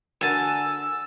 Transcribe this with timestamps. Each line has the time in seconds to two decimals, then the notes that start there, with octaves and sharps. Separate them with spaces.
0.21 D3 F#4 A#4 G#5 A5 E6